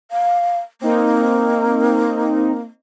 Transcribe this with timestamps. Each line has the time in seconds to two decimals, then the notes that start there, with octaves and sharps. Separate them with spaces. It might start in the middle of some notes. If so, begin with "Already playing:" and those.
0.11 F5
0.81 A#3 C4 D#4